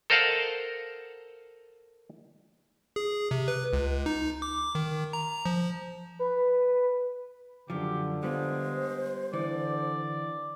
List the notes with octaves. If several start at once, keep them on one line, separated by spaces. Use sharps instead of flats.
A4 A#4 C5 D#5 F5 F#5
G#4
C3
B4
C#2
D#4
D6
D#3
A#5
F3
B4
F#2 D3 F3 G4
G3 G#3 B3 F4 C5
D3 E3 D5